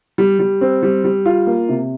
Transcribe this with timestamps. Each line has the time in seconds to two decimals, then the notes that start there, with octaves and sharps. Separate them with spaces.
0.18 G3
0.39 G3
0.61 C4
0.83 G3
1.04 G3
1.26 F4
1.47 A#3
1.69 C3